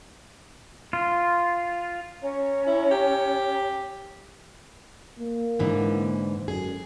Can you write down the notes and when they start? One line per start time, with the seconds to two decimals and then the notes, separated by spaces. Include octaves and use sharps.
0.93 F4
2.21 C#4 C#5 A#5
2.67 E4
2.91 G4
5.19 A#3
5.59 G#2 D3 E3
6.48 F#2 G#4